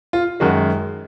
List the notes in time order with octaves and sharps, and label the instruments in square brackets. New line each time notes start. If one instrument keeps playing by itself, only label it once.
[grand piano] F4
F#2 D#3 G#3 F#4